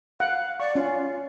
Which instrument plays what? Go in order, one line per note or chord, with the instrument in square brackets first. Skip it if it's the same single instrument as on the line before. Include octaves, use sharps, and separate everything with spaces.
[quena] F5 [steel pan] F#5
[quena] D5 [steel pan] C#6
[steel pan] C#4 [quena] F4